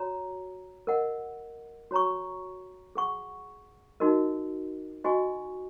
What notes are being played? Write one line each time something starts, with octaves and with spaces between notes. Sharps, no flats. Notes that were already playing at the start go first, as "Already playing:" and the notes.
Already playing: F#4 C#5 A#5
A#4 D#5 F#5
F#4 C#5 A#5 C#6
G#4 F#5 C#6
D#4 F#4 A#4 D#5
F#4 D#5 G#5 C#6